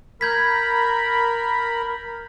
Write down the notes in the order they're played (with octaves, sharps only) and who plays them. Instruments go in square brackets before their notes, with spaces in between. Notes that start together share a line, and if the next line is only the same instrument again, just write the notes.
[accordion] A#4 B5 [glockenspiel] G6 G#6 B6